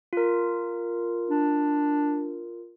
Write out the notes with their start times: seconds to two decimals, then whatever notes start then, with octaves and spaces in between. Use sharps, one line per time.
0.13 F4 A#4
1.30 D4